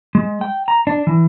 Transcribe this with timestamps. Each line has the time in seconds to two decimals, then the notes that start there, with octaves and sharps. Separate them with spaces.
0.15 G#3
0.41 G5
0.68 A#5
0.87 D4
1.07 E3